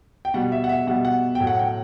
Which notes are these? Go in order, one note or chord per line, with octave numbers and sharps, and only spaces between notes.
G5
B2 G3 F#5
E5
F#5
E5
B2 G3 F#5
F#5
A2 F#3 G5
F#5
G5